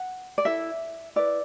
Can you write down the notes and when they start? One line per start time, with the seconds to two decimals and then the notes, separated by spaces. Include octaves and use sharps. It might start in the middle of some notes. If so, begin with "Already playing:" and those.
Already playing: F#5
0.38 D5
0.45 E4 A4 E5
1.16 E4 B4 D5